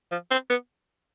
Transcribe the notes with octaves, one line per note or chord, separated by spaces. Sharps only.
F3
C4
B3